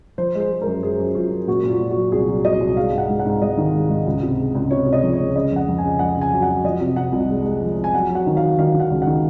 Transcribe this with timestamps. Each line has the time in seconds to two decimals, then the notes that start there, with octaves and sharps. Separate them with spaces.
0.18 F3 C5
0.35 G#3
0.40 C5
0.50 G#3
0.62 A#4
0.67 F#2
0.83 F#2 G#4
0.99 F#2
1.15 F#2 F4
1.31 F#2
1.47 A#2 F#4
1.63 A#2
1.70 F4
1.79 A#2
1.91 F#4
1.97 F#3
2.12 C2 G#4
2.28 F#3
2.45 C2 D#5
2.60 C2
2.77 G#3 F5
2.92 G#2
2.98 F#5
3.10 G#2
3.19 F#5
3.26 G#2
3.42 G#2 D#5
3.57 D#3
3.74 G#3
3.90 G#2
4.06 C#2
4.22 C3
4.39 G#3
4.55 C#2
4.71 C3 C#5
4.86 C3
4.93 D#5
5.03 F3
5.13 C#5
5.20 C#2
5.35 C#3 D#5
5.52 F2 F#5
5.68 F2
5.78 C#3 G#5
5.99 F2 F#5
6.16 C#3
6.21 G#5
6.33 F#3
6.42 F#5
6.49 F#3
6.64 F3 D#5
6.81 C3
6.96 C3 F#5
7.12 C2
7.29 G#3
7.45 G#3
7.62 F3
7.77 F3
7.84 G#5
7.94 F#3 F#5
8.09 F#3
8.15 F#5
8.26 D#3
8.37 F5
8.42 F#3
8.59 D#3 F5
8.74 D#3
8.80 F#5
8.91 C#2
9.02 D#3 F#5